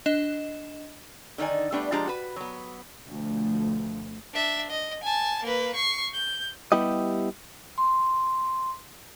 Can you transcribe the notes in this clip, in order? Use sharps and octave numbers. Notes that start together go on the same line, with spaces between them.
D4 D#5 E7
D3 D#3 D#4 D5 G#5
G3 A3 B3 D4
F3 G#3 D4 G4 A5 A#5
F#4 B4
F#3 B3
D2 B2 F3 A3
D4 E5
D#5
G#5 A5
A#3 B4
C#6 C7
G6
G3 B3 E4 G4 D#5
C6